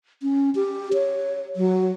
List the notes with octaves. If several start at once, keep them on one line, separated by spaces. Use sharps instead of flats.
C#4
G4
C#5
F#3